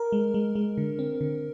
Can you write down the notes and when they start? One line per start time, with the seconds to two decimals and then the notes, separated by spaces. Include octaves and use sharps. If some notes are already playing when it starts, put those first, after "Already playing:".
Already playing: A#4
0.12 G#3
0.34 G#3
0.55 G#3
0.77 D3
0.99 C4
1.21 D3